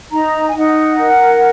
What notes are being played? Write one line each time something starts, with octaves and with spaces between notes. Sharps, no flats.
D#4 A#5
G#5
D#4 F#5
A#4